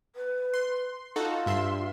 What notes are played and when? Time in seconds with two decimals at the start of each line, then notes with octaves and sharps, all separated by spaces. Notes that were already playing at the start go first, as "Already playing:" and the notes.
0.15 B4
0.54 C6
1.16 D#4 F4 F#4 A4
1.46 G2 E5 C6